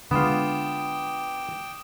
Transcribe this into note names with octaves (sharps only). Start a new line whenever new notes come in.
D3 G#3 B3 F4 G5 D6 D#6 E7